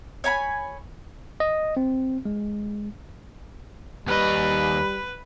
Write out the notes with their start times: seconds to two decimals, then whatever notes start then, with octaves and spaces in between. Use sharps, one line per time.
0.24 C#5 G#5 A#5 B5
1.40 D#5
1.77 C4
2.25 G#3
4.08 D#2 G3 B4 D#5